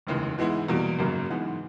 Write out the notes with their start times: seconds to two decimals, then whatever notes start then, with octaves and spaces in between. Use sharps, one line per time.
0.07 F1 D#2 C#3 E3 G#3
0.38 G#2 E3 G#3 B3 E4
0.68 E2 B2 G3 A#3
0.99 G#1 F#2 C#3 F#3 A#3
1.30 G#2 E3 G#3 B3